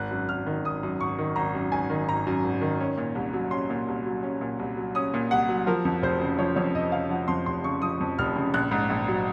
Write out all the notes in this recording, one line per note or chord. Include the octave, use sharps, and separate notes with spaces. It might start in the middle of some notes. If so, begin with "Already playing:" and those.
Already playing: G#1 F#6
F#2
G#1 F6
D#3
G#1 D#6
F#2
G#1 C#6
D#3
G#1 A#5
F#2
G#1 G#5
D#3
G#1 A#5
F#2
G#1
D#3
C#4
A#2
C2
F#3
C#4 C6
A#2
C2
F#3
C#4
A#2
C2
F#3
C#4 D#6
A#2
C2 F#5
F#3
F3 A#4
F2
F1 C5
C#3
F3 C#5
F2 C#5
F1 D#5
C#3 F5
F3 F#5
F2 C6
F1 C6
C#3 C#6
F3 D#6
F2
F1 F6
C#3
A#1 F#6
G#2
A#1
F#3